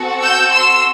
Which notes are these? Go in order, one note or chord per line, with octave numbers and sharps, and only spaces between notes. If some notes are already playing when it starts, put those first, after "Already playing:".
Already playing: C4 F#4 A4
E6 G6
C6 E6